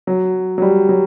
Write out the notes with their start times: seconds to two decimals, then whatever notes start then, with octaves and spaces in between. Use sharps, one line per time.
0.07 F#3
0.58 F#3
0.62 G3
0.89 F#3